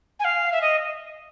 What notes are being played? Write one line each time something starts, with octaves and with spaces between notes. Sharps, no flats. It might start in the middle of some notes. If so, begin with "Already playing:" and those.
G#5
F5
E5
D#5